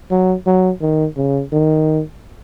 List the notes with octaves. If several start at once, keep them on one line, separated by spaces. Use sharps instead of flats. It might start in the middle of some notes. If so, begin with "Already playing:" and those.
F#3
F#3
D#3
C#3
D#3